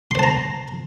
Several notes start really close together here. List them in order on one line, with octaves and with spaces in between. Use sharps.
C6 C5 A5 A#5